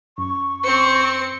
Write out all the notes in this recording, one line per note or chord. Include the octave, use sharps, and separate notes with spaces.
F#2 C#6
C4 C5 C#7